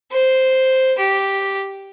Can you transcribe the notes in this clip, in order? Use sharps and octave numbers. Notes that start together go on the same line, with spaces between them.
C5
G4